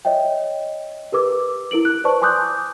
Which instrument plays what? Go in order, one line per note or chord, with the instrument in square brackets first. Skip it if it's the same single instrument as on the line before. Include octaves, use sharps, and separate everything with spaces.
[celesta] C#5 D#5 E5 G5
G4 A#4 B4 D6 E6
E4 A#4 D7 F#7
F#6
B4 C5 D5 A5 C#6
G#5 C6 D6 D#6 F#6 G6